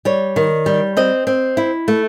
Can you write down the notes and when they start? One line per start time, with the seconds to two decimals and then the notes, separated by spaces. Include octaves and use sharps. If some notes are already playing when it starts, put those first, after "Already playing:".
0.05 G3 C#5
0.36 D#3
0.66 G3
0.97 C4 D#5
1.27 C4
1.57 E4
1.88 A3